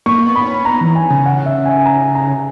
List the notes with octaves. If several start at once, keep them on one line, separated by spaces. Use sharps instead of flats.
A#3 C#6
B3
B5
C#4
B3 A#5
E3
G#5
C#3
F#5
E5
G#5
A#5
A#5